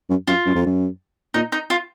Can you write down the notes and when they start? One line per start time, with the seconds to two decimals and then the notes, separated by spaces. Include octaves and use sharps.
0.09 F#2
0.27 F#2 F4
0.46 F#2
0.55 F2
0.66 F#2
1.34 A#2 D#4
1.52 D#4
1.70 F4